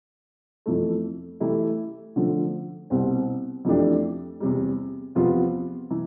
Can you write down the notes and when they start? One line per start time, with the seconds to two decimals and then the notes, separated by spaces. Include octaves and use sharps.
0.66 F2 E3 A3
1.40 E3 A3 E4 G4
2.16 D3 F3 A3
2.90 C2 B2 G3 C4
3.65 F2 E3 A3 D4 G4
4.40 E2 C3 G3
5.15 E2 C3 F3 B3 F4
5.90 E3